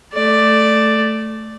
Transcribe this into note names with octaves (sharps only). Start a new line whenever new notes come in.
A3 D5